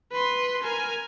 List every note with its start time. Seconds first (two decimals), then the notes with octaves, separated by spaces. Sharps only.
0.12 B4 C6
0.63 A#4 G#5